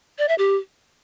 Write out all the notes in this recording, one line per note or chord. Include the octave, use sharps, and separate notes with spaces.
D5
E5
G4